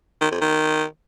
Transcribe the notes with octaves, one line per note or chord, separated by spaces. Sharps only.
D#3
F2
D#3